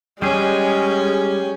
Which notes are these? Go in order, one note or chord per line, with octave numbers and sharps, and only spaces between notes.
G3 G#3 C#4 G#4